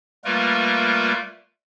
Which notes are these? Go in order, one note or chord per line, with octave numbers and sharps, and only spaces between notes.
G3 A3 A#3 F4 A#4 B4